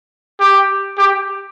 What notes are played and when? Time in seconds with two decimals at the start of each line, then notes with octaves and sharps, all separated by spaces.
0.40 G4
0.98 G4